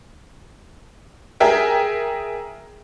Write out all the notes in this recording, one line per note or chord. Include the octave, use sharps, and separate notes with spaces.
G#4 A#4 E5 G5